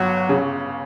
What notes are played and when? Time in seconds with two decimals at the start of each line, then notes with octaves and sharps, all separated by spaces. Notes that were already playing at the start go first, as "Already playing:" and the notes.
Already playing: G1 F#3
0.29 C#3